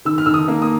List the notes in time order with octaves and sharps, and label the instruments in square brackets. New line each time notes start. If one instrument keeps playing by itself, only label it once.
[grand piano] D#3 E6
F6
D#3 E6
D#6
A#3
D#6